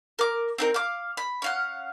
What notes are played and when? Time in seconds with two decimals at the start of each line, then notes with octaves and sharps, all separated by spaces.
0.19 A#4 D6
0.58 C4 D#4 A#4
0.74 F5 D6
1.17 B5
1.42 C#4 F5 F#5